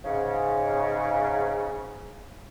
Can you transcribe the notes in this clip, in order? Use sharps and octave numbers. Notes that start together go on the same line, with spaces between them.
G#2 C#3